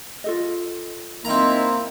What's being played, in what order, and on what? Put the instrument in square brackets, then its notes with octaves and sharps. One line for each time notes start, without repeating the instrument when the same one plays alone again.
[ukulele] F4 A4 D#5
[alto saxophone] A#3 [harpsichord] C4 A#5 [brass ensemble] D#4 E4